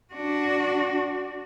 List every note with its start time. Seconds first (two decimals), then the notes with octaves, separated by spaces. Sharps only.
0.14 D4 F#4